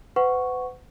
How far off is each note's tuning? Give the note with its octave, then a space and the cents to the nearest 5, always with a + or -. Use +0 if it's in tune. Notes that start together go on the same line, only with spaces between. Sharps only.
B4 +45 F#5 +0 C#6 +0